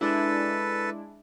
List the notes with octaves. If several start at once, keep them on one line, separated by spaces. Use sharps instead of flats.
G#3 D4 E4 A4 B4